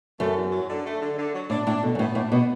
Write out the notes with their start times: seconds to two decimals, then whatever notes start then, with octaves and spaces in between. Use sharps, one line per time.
0.20 F#2 A3
0.36 E2
0.52 F#3
0.69 D3
0.86 A3
1.01 D3
1.18 D3
1.34 F#3
1.50 A2 D4
1.66 A2 D4
1.82 B2 D3
1.95 F#2
1.99 A2 B3
2.15 A2 D4
2.31 B2 B3